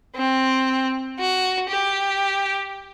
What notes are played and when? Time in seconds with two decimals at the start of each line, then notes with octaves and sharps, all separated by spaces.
0.15 C4
1.19 F#4
1.69 G4